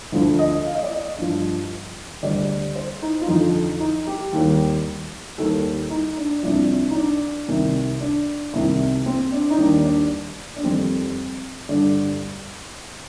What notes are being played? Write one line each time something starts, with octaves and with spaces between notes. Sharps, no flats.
D2 D3 F3
D#5
F5
D#5
D5
D#5
G2 F3
D2 D3 G3 D5
C5
D#4
F4
F2 D3 F3 D#4
D#4
G4
D#2 D#3 G3
D#2 D#3 G3 A4
D#4
D4
C2 C3 F3 D4
D4
D#4
D4
C2 C3 D#3
D4
C2 C3 D#3
C4
D4
D#4
D#2 D#3 G3 D4
D4
D4
F2 D#3 G3 C4
G2 D3 G3 D4